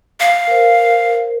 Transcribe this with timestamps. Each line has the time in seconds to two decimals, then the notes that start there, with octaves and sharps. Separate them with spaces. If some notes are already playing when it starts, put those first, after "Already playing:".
0.20 F5
0.47 A#4 C5